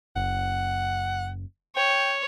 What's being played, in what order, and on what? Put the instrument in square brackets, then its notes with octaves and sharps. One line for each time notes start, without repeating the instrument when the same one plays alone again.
[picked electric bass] F#1 [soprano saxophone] F#5
[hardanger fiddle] C#5 [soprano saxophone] G5